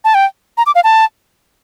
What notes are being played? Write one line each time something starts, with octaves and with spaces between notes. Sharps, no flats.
A5
G5
A#5
D6
F5
A5